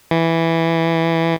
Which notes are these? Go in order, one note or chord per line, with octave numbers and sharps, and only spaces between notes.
E3